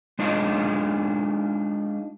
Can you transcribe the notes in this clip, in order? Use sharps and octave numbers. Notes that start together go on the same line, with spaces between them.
G#3 D4 D#4 F4 D#5 F5